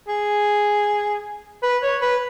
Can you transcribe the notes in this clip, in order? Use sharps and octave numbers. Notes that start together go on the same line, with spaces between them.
G#4
B4
C#5
B4